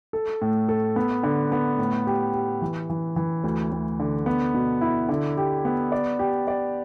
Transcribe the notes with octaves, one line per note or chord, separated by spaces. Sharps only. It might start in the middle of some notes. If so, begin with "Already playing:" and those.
A4
A2
A4
B3
D3
B3
A2
G4
G4
E3
E3
E3
D2
D2
D3
B3
B2
E4
D3
G4
B3
D5
G4
D5